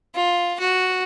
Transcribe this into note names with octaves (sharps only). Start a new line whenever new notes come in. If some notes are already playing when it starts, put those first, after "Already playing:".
F4
F#4